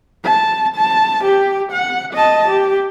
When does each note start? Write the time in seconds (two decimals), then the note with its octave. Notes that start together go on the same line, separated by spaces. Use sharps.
0.24 A5
0.76 A5
1.24 G4
1.72 F#5
2.14 D#5 A5
2.49 G4